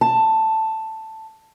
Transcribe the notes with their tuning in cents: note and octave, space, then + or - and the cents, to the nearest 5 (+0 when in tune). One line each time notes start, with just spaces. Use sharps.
A5 +5